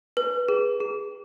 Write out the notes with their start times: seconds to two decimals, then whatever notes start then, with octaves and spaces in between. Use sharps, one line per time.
0.17 B4
0.48 G#4
0.80 G#4